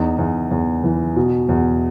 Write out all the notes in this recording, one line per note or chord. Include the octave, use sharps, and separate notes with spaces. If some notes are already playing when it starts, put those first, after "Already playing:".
Already playing: E2 D#4
E2
E2
E3
B2
E2